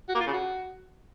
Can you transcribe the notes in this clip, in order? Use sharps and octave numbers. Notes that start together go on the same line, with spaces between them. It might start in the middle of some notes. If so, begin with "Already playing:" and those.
F#4
A#3
F4
C#3
F#4